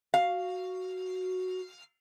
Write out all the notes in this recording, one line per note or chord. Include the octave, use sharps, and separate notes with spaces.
F#4 F5